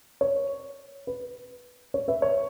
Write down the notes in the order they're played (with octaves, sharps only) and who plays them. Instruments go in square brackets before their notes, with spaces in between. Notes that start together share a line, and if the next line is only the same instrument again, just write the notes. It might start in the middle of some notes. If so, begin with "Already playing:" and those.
[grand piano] C#5
B4
C#5
B4 E5
C#5